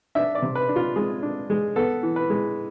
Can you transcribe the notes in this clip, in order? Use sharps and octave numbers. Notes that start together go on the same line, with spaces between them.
D4 E5
D5
C3
B4
D4
F4
G#3 G#4
D4
G#3
B3 A4
E3
B4
G#3